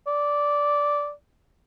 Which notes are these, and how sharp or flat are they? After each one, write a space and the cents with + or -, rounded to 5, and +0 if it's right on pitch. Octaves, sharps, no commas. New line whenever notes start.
D5 -10